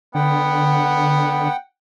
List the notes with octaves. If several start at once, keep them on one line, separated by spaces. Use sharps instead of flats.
D3 B3 F#5 G5